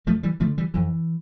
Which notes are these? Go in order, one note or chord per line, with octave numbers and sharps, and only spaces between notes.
F2 F3 A3
E3 G3
D3 F3 A3
E3 G3
F2 E3